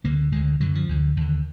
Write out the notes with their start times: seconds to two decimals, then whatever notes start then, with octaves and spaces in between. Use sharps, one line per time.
0.04 D2 D3 A#3
0.32 D2 G#3
0.36 D3
0.60 F#2 D3 F#3
0.75 F3
0.89 D2 D3
1.17 D#2 D3